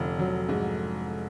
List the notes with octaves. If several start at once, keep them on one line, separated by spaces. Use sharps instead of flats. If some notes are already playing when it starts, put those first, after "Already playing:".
Already playing: F1 D3
F#3
G#2